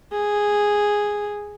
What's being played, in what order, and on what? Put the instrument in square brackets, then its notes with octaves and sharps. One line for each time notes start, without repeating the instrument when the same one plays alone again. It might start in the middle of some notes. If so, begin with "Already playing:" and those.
[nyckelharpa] G#4